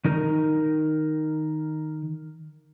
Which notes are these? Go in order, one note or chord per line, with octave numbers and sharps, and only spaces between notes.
D#3 D#4 A#4